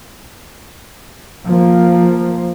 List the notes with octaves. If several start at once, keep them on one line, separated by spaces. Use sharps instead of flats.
F3 A#3